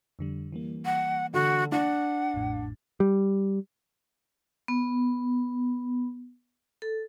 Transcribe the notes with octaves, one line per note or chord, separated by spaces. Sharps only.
F2 D3 G3
E3 G3 A#3
F#5
D3 F#4
D4 F#5
A1 F2 A2
G3
B3
A4